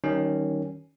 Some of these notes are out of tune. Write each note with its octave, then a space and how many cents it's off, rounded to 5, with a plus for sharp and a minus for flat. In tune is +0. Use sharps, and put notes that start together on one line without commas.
D#3 +0 G3 -40 C#4 +0